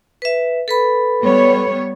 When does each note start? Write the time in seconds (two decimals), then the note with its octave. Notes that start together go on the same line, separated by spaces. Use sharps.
0.22 B4 E5
0.68 A4 B4 B5
1.21 G3 B3 C#5